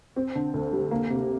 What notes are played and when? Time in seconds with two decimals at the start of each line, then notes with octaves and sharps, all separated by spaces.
0.16 C4
0.35 D3
0.54 D2
0.73 G3
0.91 A#3
1.10 C3